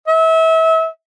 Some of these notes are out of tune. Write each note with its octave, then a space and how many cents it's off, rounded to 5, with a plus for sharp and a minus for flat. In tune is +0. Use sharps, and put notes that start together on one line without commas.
E5 -30